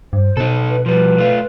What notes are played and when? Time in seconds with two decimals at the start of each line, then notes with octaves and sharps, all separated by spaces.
0.13 G2 C5
0.37 B2 D#4 A4
0.69 B4
0.86 F3 G3 B4
1.18 A3 F4